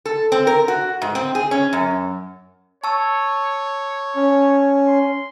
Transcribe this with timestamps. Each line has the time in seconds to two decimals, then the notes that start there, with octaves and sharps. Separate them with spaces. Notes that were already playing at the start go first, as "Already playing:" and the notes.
0.06 A4
0.32 C4
0.47 A#4
0.68 F#4
1.02 G#2
1.15 C4
1.35 G#4
1.51 C#4
1.73 F#2
2.84 C#5 A5 C#6 E6
4.16 C#4
4.88 C6